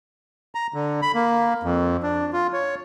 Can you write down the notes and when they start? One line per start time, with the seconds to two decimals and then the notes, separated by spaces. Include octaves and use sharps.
0.55 A#5
0.74 D3
1.02 B5
1.14 A#3
1.63 F2
2.03 D4
2.33 F4
2.53 C#5